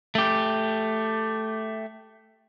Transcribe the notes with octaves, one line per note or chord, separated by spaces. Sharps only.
A3 G4